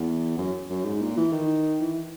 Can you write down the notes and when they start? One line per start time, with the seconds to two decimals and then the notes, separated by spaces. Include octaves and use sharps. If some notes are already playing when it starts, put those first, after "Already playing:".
Already playing: E2
0.38 F#2
0.70 F#2
0.84 G#2
1.02 A#2
1.17 E3
1.32 D#3
1.81 E3